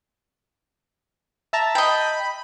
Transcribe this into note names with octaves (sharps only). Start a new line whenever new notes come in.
E5 A5 A#5
D#5 G5 B5